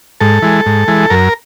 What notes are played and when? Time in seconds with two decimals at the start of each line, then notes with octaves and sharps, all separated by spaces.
0.20 G#2 A4
0.42 E3 G#3
0.66 G#2
0.88 E3 G#3
1.10 F#2 A#4